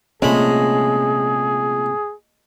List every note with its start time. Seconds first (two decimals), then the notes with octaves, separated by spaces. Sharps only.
0.22 A#1 C3 G#3 A3 C#4 G#4 B5